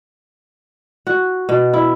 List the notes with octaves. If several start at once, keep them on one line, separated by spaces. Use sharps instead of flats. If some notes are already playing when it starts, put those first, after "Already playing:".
F#4
B2
E4